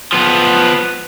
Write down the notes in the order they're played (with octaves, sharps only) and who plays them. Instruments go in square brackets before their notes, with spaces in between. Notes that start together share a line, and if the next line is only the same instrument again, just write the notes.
[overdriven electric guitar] F3 B3